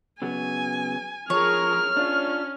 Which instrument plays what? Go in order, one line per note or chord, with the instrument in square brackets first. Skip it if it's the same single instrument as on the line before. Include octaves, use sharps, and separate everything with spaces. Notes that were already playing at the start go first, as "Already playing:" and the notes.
[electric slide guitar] C#3 F#3 B3 [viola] G#5
[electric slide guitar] F3 [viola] G#4 A#4 [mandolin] C#5 [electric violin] F6
[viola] C#4 [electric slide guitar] D4 F4